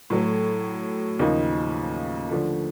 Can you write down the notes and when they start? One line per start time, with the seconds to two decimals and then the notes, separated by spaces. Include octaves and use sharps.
0.10 A2 F#3 A3
1.19 D#2 C#3 F3 A#3 D#4
2.29 D3 F3 A3